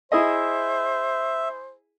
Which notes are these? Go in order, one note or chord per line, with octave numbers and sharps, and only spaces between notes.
E4 G#4 C5 D#5 E5